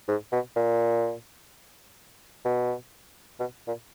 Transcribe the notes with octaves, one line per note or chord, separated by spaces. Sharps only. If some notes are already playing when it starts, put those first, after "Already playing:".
G#2
B2
A#2
B2
B2
A#2